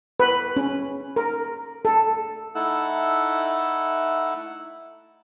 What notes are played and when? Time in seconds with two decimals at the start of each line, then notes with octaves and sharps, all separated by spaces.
0.20 B4
0.56 C#4
1.16 A#4
1.85 A4
2.55 A3 D#4 E4 A4 F#5 E6